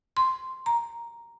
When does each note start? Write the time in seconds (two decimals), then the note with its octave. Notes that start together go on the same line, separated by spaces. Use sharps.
0.17 C6
0.66 A#5